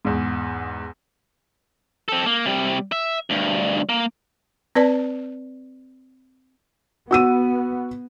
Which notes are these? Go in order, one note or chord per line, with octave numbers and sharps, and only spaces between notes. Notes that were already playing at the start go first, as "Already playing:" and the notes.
E2 G#2
C4 A4
A#3
C3 G3
E5
D2 G2
A#3
C4 B4 D5 A5
B3 F#4 E6 D#7